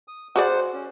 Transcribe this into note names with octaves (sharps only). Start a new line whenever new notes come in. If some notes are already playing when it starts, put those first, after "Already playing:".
D#6
F#4 G#4 C5 D5 F#5
C#4